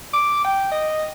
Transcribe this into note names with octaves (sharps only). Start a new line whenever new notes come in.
D6
G5
D#5